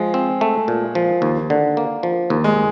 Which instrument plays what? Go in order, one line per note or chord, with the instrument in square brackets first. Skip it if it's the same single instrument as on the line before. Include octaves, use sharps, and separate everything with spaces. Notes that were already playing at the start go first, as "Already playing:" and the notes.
Already playing: [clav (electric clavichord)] F3 [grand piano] G#3
[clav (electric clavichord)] C4
A3
A#2
F3
D#2
D3
A#3
F3
D#2
[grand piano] G#3